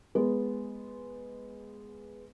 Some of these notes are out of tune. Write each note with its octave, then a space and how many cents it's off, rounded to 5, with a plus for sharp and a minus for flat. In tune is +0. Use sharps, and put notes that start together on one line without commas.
G#3 +0 B3 +0